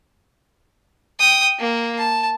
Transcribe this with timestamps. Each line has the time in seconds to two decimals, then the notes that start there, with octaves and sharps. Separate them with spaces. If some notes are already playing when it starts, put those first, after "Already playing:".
1.19 G5 D#6
1.59 A#3
1.98 A5